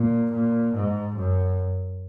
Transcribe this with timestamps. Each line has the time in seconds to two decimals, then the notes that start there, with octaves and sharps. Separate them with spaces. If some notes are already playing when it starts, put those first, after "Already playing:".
Already playing: A#2
0.31 A#2
0.74 G#2
1.16 F#2